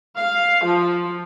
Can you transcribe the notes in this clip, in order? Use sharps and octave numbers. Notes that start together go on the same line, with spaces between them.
F5
F3